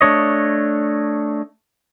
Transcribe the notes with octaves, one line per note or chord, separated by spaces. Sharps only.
A3 D4 C#5 D#5